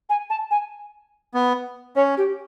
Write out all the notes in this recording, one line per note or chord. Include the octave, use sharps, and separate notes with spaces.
G#5
A5
G#5
B3
C#4 C#5
G4